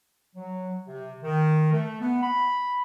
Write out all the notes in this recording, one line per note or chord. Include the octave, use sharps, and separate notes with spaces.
F#3
C3
D#3
A3
B3
B5